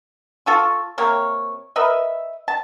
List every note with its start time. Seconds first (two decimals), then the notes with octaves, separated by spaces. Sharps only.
0.46 F4 A4 C#6
0.98 C3 A#3 A#4 C#5
1.76 A#4 B4 D#5 E5
2.48 A5